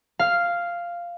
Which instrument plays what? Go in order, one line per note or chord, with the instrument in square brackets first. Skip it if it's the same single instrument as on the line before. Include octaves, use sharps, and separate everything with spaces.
[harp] F5